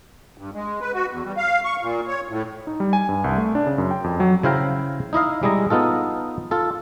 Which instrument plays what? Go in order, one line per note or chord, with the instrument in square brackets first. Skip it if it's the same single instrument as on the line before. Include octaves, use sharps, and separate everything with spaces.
[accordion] G2
G#3
B4
F#4
E2
G3
F5
C#6
A#2
C#5
A2
[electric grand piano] D#4
G3
G#5
G2
C2
A3
D4
C#3
F#2
G5
F2
F#3
[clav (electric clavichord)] C#3 E4 C5 F5 G5 A#5
D#4 E4 D#5 F5
G3 G#3 E4 D#5 A#5
B3 D#4 F4 A4
F4 A4